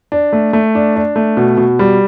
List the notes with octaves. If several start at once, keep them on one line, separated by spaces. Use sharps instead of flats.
D4
A3
A3
D4
D4
A3
B2
B2
G3